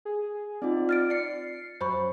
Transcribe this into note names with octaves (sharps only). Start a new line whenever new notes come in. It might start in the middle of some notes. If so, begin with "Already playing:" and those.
G#4
C4 D#4 F4 D5
F6 A6 D7
D5 A6 C7 C#7
F#2 C5 B5 C#6